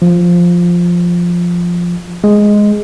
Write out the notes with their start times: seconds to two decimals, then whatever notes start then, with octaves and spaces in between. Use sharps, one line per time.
0.02 F3
2.24 G#3